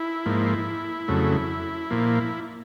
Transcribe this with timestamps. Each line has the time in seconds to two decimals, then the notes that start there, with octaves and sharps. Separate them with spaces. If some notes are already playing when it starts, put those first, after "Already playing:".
Already playing: E4
0.26 G#2 F3 A#3
1.08 F2 C#3 F#3 A3
1.91 A#2 F3 A#3